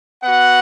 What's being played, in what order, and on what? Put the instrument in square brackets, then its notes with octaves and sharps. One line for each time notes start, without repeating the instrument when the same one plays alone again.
[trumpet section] B3 F#4 F#5